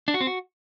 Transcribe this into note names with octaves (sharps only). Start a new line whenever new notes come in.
D4
F#4
C4
F#4